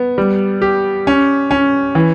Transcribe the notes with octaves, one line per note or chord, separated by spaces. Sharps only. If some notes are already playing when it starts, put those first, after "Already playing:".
Already playing: B3
G3
G4
C#4
C#4
E3